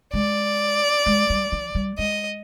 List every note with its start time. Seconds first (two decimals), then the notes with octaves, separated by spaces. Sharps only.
0.14 G#3 D5
1.06 G#3
1.30 G3
1.52 F3
1.75 G3
1.98 G#3 D#5